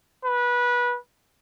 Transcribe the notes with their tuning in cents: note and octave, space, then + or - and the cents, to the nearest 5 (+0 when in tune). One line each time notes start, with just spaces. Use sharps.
B4 -20